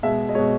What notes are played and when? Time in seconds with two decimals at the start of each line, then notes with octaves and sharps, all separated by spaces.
0.03 B2 G#3 E5
0.29 D#5
0.35 B2 G#3 C#5